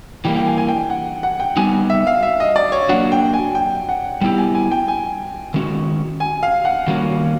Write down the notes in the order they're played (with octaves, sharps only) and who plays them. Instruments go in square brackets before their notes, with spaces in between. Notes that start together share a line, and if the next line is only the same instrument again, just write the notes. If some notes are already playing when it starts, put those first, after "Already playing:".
[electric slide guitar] E3 G3 A#3 [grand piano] G5
[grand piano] G5
G#5
G#5
G5
F#5
F#5
G5
[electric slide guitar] G3 B3 D#4 F#4 [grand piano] G#5
[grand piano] E5
F5
E5
D#5
D5
C#5
[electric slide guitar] F#3 A#3 D4 F#4 [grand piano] F#5
[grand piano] G5
G#5
G5
F#5
[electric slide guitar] G3 B3 E4 G4 [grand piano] G5
[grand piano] G#5
G#5
G5
G#5
[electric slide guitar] D#3 G#3 C#4 F#4
[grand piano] G#5
F5
F#5
[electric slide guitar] D#3 G3 A#3 C#4 F#4